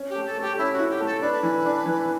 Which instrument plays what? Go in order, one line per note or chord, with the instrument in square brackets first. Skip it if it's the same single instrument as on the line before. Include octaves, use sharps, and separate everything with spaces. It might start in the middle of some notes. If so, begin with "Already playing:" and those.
Already playing: [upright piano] C#4
[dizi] G4
[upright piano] A3
[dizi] A4
[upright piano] A3
[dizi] G4
[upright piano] C#4 [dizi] E4
[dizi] F#4
[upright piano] E4
[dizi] G4
[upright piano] A3
[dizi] A4
[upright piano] D4 [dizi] B4
[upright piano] E3
D4
E3